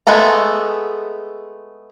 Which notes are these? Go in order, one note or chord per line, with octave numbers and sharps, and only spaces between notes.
G#3 A3 B3 A4 A#5